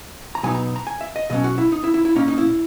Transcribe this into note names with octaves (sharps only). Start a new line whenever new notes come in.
A#5
B2 F#3 B3 D#4 G#5
A#5
A#5
G#5
E5
D#5
B1 B2 F#3 C#4 D#5
F#4
E4
D#4
E4
E4
E4
A#2 A#3 C#4 D#4
D#4
E4